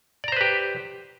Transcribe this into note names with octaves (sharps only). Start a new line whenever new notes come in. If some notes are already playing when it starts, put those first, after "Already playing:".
G4 B4 C5 D5 A#5